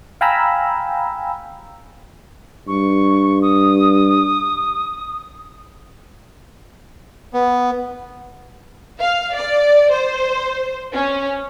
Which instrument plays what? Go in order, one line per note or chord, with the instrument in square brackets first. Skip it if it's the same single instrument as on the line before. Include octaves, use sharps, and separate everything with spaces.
[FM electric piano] F5 G5 G#5 A#5 B5 E6
[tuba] G2 [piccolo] C#6
[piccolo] D#6
[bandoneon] B3
[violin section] F5
D5
C5
C#4